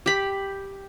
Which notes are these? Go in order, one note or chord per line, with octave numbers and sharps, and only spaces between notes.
G4 B5